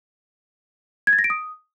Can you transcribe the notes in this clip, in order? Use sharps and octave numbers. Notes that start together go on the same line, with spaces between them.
G#6
A6
A#6
D7
D#6